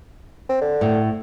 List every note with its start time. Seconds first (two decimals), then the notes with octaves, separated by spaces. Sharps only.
0.49 C4
0.61 D3
0.81 A2